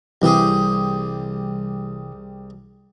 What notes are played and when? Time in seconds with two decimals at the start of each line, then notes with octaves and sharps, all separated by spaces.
0.22 C2 C3 E3 G3 G4 G#4